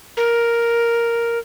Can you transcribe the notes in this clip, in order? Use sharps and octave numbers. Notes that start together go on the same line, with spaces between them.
A#4